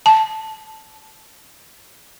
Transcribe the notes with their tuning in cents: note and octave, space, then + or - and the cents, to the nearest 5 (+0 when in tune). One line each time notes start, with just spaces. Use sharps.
A5 +0